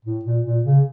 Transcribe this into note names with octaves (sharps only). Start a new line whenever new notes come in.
A2
A#2
A#2
C#3